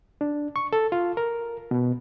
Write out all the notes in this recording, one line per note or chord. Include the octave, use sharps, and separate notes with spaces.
D4
C#6
A4
F4
A#4
B2